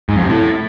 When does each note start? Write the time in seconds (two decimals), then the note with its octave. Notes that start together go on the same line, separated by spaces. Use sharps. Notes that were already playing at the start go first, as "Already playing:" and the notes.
0.09 G#2
0.16 F2
0.23 C3
0.30 A2